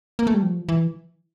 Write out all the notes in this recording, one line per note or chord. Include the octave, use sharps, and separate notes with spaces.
A#3
A3
G3
F3
E3